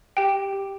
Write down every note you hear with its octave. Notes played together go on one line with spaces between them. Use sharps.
G4 G5
G4